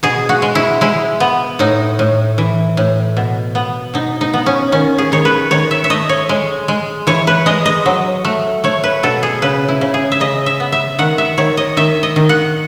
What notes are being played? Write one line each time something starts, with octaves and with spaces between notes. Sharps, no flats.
B2 G#4
F#4
G#3
E4
G#3 E4
B3
A2 D#4
A2
E3
A2
B2
B3
B2 D#4
D#4
B3
C#4
D#3 C#4
G#4
D#3 C#5
B4
D#3 C#5
E5
E5
A3 D#5
C#5
G#3
G#3
E3 C#5
B4
G#3 D#5
D#5
F#3
A3
A3 C#5
B4
B2 A4
G#4
C#3 B4
E4
C#3
G#4
E5
C#3 D#5
E5
B3
E5
D#3 F#5
E5
D#3 C#5
D#5
D#3 E5
D#5
D#3
F#5